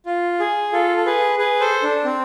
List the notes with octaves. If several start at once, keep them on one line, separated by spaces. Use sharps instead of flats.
F4
G#4
F4 A4
A4
G#4 B4
G#4 B4
A4 C5
D4
C4